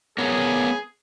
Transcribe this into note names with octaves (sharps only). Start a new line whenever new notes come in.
B3 G#4 A#4 C#5